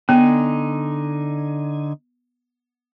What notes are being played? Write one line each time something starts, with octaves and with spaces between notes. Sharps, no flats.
D3 B3 D#4 G#5